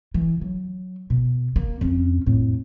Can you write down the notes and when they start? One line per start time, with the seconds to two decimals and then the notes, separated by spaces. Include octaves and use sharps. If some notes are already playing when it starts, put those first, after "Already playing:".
0.14 E3
0.41 F#3
1.10 B2
1.56 A#3
1.81 F2 C#4
2.26 F2 A2